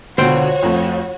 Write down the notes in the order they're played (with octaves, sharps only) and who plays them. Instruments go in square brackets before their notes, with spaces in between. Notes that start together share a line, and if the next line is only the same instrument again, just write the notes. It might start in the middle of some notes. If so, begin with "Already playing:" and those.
[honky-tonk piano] C#2 B2 D3 [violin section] F#4 C#5 [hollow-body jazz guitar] C5 F#5 G5
[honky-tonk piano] F2 A3